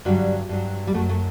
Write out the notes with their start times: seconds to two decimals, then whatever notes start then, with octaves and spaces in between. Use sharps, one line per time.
0.05 G2 D3 F#3 G3
0.49 G2 F#3
0.87 G3
0.94 F#2 F#3 A3
1.09 A3